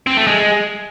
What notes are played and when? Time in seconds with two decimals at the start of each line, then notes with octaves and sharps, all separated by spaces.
0.07 C4
0.17 A3
0.27 G#3